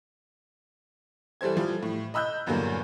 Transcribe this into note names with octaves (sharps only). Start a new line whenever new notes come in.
E3 G3 A4 C5 G#6
E3 F3 G3
A2
D#5 B5 E6 F#6 G6
E2 G2 A#2 D3 F#3 A#3